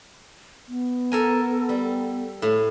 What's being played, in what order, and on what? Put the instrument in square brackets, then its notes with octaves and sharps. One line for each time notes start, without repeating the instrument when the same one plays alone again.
[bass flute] B3
[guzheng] A4 A#4 G#5
G3
A2